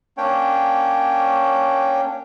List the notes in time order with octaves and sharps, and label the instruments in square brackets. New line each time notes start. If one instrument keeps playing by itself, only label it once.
[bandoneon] A#3 C#4 D4 C#5 G5